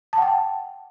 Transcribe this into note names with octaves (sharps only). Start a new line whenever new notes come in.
F#5 G5 A5